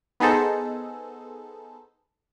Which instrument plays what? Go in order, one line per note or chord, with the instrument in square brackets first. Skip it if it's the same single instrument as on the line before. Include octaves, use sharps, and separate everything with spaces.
[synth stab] B3 D#4 G#4 A4 C5